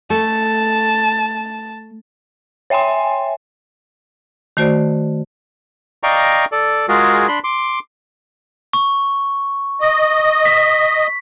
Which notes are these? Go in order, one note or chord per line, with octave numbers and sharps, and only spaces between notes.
A3 A5
C#5 E5 G5 G#5 C6
D#3 A3 F#4 C5 D5
D5 D#5 F5 G5 A#5 C#6
A4 D5
G#3 F4 F#4 G#4 A#4
D4 B5 C6
C6 D6
C#6
D#5
B6